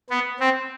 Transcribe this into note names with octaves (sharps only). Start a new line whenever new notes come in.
B3
C4